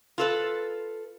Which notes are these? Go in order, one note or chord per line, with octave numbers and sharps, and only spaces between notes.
F4 A4 B4